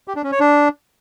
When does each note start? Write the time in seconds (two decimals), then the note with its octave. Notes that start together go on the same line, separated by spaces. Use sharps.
0.08 G4
0.16 D4
0.24 C#4
0.32 C#5
0.40 D4